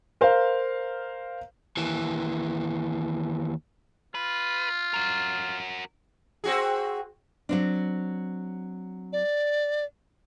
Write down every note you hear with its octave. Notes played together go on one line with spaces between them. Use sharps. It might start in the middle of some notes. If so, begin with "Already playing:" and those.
A#4 C5 F5
D#2 E3
F4 B4
F#4 A#4
C4 F#4 G#4
F#3 C4 D4
D5